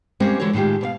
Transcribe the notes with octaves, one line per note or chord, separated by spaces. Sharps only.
G3 G#3 A#3 C4 C#4 A#4
D3 E3 G#3 F#4 C#5
A2 D#3 G#3 F4 G4
B2 C#5 F5